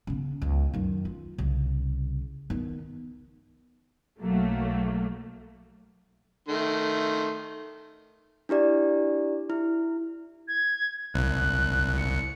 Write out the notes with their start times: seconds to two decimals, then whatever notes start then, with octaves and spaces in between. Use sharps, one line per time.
0.07 C#3 B3
0.42 C#2
0.74 F#2 D#3
1.05 F4
1.38 C2 C#3
2.50 D#3 B3
4.21 B1 F#3 A3 A#3
6.48 D#3 A3 C6
8.49 D4 E4 G4 D5
9.50 E4
10.48 G#6
11.14 C2 F#6
11.97 C#7